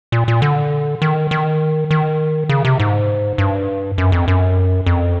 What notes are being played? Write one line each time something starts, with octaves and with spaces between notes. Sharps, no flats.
A#2
A#2
D3
D#3
D#3
D#3
C#3
C3
G#2
G2
F#2
F2
F#2
F2